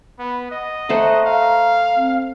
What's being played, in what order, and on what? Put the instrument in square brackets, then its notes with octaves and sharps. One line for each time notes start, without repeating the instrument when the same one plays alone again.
[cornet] B3 [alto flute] B5
[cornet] D#5 [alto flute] F#5
[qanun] A3 C5 F#5 [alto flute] A#5
[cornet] F5
[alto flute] C4